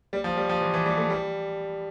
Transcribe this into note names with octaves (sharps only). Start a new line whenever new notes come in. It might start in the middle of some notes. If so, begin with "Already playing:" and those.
G3
F3
G3
F3
E3
E3
G3
A3
G3